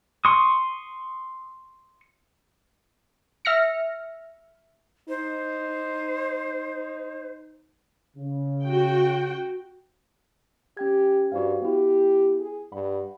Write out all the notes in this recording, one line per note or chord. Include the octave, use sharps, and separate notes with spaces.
C6 C#6 D#6
E5 F6 A#6 C#7
D#4 C5
C#3
F#4 G5
C#4 G4 G5 G#6
G2 F#4 C5 F5
B3 E4 G4
G#4
G2 F#5 B5